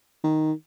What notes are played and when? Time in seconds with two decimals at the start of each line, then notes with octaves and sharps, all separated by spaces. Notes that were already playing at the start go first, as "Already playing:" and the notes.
0.24 D#3